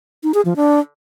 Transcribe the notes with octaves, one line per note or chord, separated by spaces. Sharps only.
D#4
G#4
F3
D4